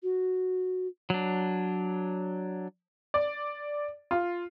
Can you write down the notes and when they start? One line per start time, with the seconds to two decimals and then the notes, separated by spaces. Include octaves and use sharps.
0.03 F#4
1.10 F#3 D4
3.14 D5
4.11 F4